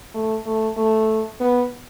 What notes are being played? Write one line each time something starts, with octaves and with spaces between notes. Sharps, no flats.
A3
A3
A3
B3